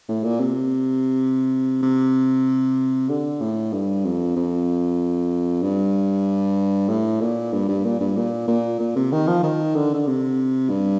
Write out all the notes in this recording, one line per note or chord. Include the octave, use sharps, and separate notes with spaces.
A2
A#2
C3
C3
D3
A2
G2
F2
F2
G2
A2
A#2
G2
G2
A#2
G2
A#2
A#2
A#2
C3
D#3
F3
D#3
D3
D3
C3
G2